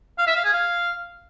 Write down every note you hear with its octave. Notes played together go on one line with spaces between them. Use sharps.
F5
E5
F5
G#4
F5